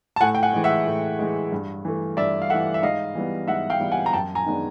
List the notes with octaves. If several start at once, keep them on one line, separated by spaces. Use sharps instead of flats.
A5
A2 F#5 G#5
G5
F#5 G#5
E3 G#3
E5 F#5
A2
E3 G#3
G2
E3 A3
G2 D5 E5
F5
E3 A3 E5 F#5
E5
G#2 D#5 F5
E3 G3 B3
G#2 E5 F#5
F5 G5
E3 G3 B3
F#5 G#5
A#5
F#2 G5 A5
G#5 A#5
D#3 G#3 B3 D4